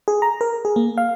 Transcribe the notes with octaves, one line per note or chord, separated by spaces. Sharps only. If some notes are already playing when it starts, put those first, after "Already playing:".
G#4
A#5
A#4
G#4
A#3
F5